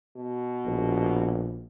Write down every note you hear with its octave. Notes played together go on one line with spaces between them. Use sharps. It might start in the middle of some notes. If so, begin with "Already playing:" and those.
B2
A#1